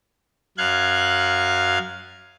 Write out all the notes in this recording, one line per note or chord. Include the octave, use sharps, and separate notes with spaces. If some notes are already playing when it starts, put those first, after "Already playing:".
F#2 F5 F#6 G#6